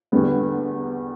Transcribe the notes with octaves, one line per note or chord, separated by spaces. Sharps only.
E2 D3 G3 B3